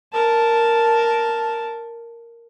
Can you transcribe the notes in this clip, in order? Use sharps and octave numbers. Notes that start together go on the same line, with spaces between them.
A#4 A5